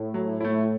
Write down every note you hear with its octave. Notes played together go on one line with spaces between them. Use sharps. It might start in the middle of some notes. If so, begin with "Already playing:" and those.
Already playing: A2
F#3
A3 E4